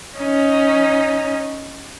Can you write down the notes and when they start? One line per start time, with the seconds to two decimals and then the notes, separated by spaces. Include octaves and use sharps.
0.17 C#4 D#4